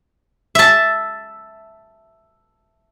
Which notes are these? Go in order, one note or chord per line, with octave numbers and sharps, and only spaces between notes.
E5 A5